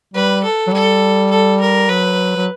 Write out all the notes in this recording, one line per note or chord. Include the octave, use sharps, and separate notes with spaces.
G3 B4
A4
F#3
G3 A4
A4
A#4
F#3 B4
F#3